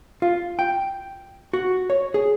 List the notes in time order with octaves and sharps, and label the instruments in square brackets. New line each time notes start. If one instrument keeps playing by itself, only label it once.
[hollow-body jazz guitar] F4
G5
F#4
C#5
G#4